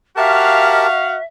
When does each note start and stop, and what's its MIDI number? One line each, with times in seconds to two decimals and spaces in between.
0.17 1.18 66
0.17 0.87 67
0.17 0.87 70
0.17 1.24 76
0.17 1.18 77
0.17 0.87 81